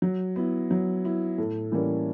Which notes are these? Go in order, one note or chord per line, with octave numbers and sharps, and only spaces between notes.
F#3
B3 E4
F#3
B3 E4
A2
E3 G3 A#3 C#4